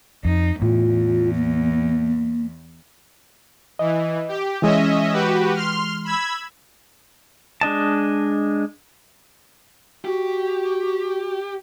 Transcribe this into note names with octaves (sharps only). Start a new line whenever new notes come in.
F2 D#4
E2 A2 F4
A#3
E3 D#5
G4
E3 G#3 C#4 D#5 E5
F#4 G4 B4
C6 F6
B5 E6 G#6
G#3 D4 D#5 A5
F#4 G4